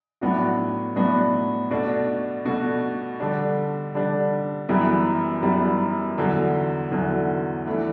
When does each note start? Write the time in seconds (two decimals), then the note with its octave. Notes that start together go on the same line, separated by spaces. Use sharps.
0.21 A2 F#3 B3 D4 F#4
0.96 A2 F#3 B3 D4 F#4
1.71 B2 A3 D4 F#4
2.45 B2 A3 D4 F#4
3.20 D3 G3 D4
3.94 D3 G3 D4
4.69 F#2 E3 G3 B3
5.43 F#2 E3 G3 B3
6.18 E2 D3 F#3
6.92 E2 D3 F#3
7.66 E3 A3 D4